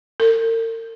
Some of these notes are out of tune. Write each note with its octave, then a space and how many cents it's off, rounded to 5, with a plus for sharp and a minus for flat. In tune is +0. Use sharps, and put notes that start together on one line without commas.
A#4 -40